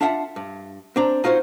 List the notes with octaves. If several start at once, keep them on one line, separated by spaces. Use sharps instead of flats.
D4 F4 E5 F#5 G5 A5
G2
C4 D4 A#5
D#4 F4 F#4 C5 C#5